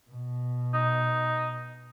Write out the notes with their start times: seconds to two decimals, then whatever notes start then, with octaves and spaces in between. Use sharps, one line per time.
0.11 B2
0.73 D#4